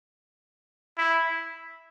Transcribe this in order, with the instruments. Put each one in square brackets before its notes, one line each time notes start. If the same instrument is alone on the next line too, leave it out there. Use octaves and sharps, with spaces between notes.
[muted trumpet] E4